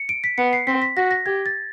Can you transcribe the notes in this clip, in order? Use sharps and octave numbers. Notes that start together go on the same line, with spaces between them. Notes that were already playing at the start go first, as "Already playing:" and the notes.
Already playing: C#7
D7
B6
B3 C#7
C7
C4 B6
B6
F#4 A#6
A#6
G4 G#6
A6